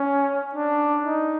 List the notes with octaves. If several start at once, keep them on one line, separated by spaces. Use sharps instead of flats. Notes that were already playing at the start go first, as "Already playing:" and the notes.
Already playing: C#4
D4
D#4